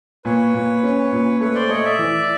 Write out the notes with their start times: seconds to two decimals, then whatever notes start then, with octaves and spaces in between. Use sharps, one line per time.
0.25 A#2 B4 C#5
0.54 A#2
0.83 C#4
1.12 A#2
1.40 A3 B4 C#5
1.55 C5 D5
1.69 A3 C#5 D#5
1.85 D5 E5
1.99 E3